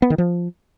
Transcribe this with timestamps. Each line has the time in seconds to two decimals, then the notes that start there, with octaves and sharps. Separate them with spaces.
0.02 B3
0.10 D#3
0.18 F3